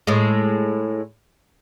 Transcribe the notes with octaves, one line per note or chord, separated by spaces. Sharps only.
A2 G#3